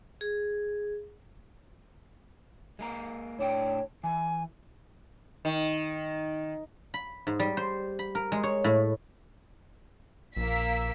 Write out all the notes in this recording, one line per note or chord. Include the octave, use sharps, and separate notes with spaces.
G#4
G#3 A#3 A#5
A2 D4 C#5 G5
E3 G#5
D#3
B5
G#2
G3
C5
B5
A#4
G#3
C#5
A2
A#1 A#3 E6 B6